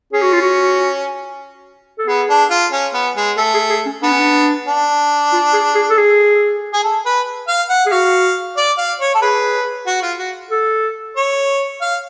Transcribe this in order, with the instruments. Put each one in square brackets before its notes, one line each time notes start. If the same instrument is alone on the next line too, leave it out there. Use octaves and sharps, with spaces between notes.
[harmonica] C#4 [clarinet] G#4
[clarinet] F#4
F4
F#4
A4
[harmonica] B3 [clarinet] G#4
[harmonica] D4
F4
C#4
B3
G#3
[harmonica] A3 [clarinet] A4
[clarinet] G#4
G#4
C#4
[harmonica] B3 [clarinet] D4
[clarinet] C#4
D4
[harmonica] D4
[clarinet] F4
G#4
G#4
A4
G#4
[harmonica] G#4
A4
B4
F5
F#5
[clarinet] G#4
[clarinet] F#4 [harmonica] F5
[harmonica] D5
F5
C#5
A4
[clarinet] G#4 [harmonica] B4
[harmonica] F#4
F4
F#4
[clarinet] A4
[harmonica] C#5
F5